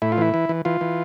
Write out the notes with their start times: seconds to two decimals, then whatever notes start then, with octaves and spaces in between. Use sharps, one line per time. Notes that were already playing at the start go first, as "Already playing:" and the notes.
0.02 A2 E4
0.12 F4
0.18 E3 E4
0.34 E3
0.49 E3
0.65 E3 F4
0.81 E3